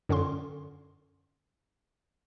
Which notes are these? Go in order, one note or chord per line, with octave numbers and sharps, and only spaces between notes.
F#2 D3 C#4 C6